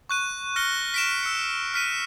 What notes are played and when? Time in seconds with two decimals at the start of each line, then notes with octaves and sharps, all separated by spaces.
0.09 C#6 F#6 D#7
0.56 F6 A#6 C#7 D#7 G7
0.94 B6 D7 E7
1.23 E6 C#7
1.74 F6 B6 D#7